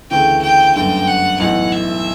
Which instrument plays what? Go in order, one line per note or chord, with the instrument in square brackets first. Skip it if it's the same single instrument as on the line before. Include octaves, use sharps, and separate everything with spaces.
[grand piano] D2 C#3 E3 A3 [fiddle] G5
[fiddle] G5
[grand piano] G1 F#2 D3 A3 [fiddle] G5
[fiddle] F#5
[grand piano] B1 A2 E3 [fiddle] F#5
[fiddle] E5